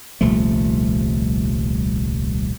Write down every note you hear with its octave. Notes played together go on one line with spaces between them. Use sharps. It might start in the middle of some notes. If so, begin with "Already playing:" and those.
D#1 C2 F3 A3